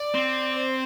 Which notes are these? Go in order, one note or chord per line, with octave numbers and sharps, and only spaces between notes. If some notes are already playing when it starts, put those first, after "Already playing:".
Already playing: D5
C4
C5